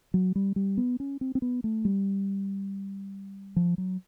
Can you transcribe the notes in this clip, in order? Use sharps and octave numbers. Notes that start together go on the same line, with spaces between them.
F#3
G3
G3
B3
C#4
C4
C4
B3
A3
G3
F3
F#3